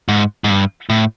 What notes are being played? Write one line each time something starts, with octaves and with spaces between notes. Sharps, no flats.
G#2
G#2
G2
A2